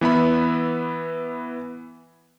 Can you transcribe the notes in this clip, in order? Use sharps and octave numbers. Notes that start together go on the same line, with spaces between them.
E3 B3 E5 B5